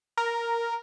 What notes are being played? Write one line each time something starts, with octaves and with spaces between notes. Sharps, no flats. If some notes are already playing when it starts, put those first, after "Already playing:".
A#4